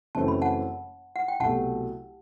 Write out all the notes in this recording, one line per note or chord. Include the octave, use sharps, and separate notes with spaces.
F#1 F#2 E3 A3 C4 A5
B5
F#5 A5
F#5
G5
C2 B2 F#3 A3 F#5 A5